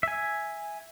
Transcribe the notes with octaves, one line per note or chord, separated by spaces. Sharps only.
E5 G#5